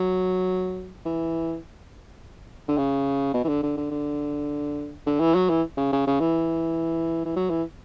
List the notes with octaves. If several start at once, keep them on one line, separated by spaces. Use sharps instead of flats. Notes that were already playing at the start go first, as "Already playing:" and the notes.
Already playing: F#3
E3
D3
C#3
B2
E3
D3
D3
D3
D3
D3
E3
F#3
E3
C#3
C#3
C#3
E3
E3
F#3
E3